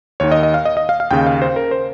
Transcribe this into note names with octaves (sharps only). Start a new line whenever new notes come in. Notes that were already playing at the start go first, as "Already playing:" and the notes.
D#2 D#3 C#5
D#5
D#5
F5
D#5
D#5
F5
F5
D#2 C#3 G5
F5
C5
A#4
C5